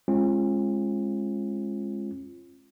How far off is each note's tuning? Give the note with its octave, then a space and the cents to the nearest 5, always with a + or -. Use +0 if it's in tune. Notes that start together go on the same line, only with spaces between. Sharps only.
G#3 +0 C#4 -45 F4 -15